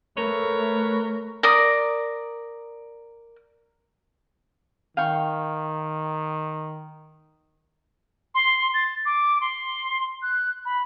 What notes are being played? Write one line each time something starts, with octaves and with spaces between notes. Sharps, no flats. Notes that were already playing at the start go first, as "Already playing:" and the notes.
A3 A#4 B4 C#5
A#4 D5 D#6
D#3 F5 G5 C#6
C6
A6
D6
C6
F#6
B5